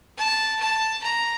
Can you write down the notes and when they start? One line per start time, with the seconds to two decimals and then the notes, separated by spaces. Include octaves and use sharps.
0.18 A5
0.60 A5
1.04 A#5